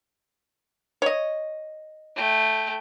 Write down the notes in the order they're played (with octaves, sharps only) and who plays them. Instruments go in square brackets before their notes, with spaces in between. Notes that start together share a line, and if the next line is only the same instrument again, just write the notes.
[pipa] C#5 D#5
[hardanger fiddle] A3 G5